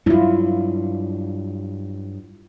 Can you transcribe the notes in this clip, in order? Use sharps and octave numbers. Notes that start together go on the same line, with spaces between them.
G2 F#3 E4 F4